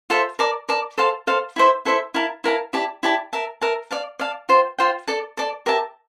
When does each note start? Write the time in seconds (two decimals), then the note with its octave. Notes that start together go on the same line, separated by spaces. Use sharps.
0.10 F4 A4 C5 E5
0.39 A#4 D5 A5 D6
0.69 A#4 D5 A5 D6
0.98 A4 C5 F5 A5
1.27 A4 C5 F5 A5
1.56 E4 A4 C5 E5
1.85 E4 A4 C5 E5
2.14 E4 A#4 F5 A5
2.44 E4 A#4 F5 A5
2.73 E4 G4 D5 A5
3.03 E4 G4 D5 A5
3.33 A#4 E5 A5
3.61 A#4 E5 A5
3.91 D5 F5 A5
4.19 D5 F5 A5
4.49 F4 C5 G5
4.78 F4 C5 G5
5.08 A4 D5 A5
5.37 A4 D5 A5
5.66 G4 A#4 E5 A5